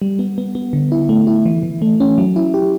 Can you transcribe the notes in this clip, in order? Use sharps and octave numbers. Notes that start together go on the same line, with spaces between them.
G3
B3
B3
B3
D3
E4
A3
E4
E3
E3
A3
C#4
F#3
E4
G4